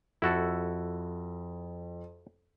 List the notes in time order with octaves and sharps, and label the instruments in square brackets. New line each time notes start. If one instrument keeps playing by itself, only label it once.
[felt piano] F2 [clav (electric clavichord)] E4 F#4 A4